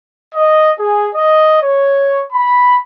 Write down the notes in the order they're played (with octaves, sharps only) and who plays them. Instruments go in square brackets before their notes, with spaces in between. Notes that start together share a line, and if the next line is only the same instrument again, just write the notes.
[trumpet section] D#5
G#4
D#5
C#5
B5